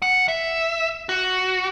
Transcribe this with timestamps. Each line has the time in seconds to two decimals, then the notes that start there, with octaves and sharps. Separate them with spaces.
0.02 F#5
0.28 E5
1.09 F#4